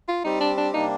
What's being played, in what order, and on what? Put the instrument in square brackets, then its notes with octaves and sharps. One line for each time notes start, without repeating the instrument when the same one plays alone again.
[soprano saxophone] F4
[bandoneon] G3 C4 G4 [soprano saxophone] D#4
[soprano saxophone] D4
D4
[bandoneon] C3 G3 A#3 D4 [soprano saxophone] D#4